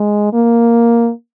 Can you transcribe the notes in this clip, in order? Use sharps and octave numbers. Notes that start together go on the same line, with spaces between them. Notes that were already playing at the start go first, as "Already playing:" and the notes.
Already playing: G#3
A#3